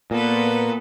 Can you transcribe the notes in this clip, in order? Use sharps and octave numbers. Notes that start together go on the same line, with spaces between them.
A#2 B3 A4 B4